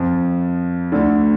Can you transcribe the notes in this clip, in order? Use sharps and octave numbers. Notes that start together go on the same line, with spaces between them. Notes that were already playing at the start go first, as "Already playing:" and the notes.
Already playing: F2 F3
D2 D3